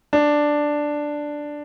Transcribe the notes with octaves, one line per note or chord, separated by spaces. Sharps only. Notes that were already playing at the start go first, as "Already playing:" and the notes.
D4